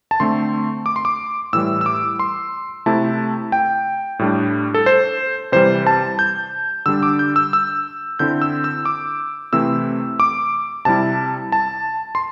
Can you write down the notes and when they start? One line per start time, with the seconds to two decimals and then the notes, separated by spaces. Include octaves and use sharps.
0.11 A5
0.20 D3 A3 C4 C6
0.86 D6
0.96 C6
1.05 D6
1.53 A2 E3 G3 E6
1.81 E6
1.86 D6
2.19 C6
2.86 C3 A3 E4 A5
3.52 G5
4.19 A2 G3 D4
4.74 A4
4.86 C5
5.52 C3 E3 G3 C5
5.87 A5
6.19 G6
6.86 D3 G3 D4 E6
7.03 D6
7.19 G6
7.36 E6
7.53 E6
8.19 D3 C4 E4 G6
8.42 E6
8.64 E6
8.85 D6
9.53 C3 E3 A3 C4 E4 E6
10.20 D6
10.85 C3 G3 E4 A5
11.52 A5
12.15 C6